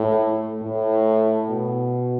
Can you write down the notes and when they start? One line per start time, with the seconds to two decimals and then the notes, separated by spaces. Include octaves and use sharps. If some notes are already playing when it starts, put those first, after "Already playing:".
Already playing: A2
0.62 A2
1.50 B2